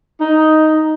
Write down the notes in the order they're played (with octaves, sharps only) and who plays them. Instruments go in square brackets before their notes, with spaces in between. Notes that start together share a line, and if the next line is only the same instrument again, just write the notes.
[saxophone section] D#4